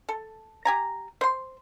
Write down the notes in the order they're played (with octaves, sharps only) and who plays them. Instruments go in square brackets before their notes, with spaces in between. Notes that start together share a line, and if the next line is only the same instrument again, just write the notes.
[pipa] A4
G4 G#5 A#5
C5 C6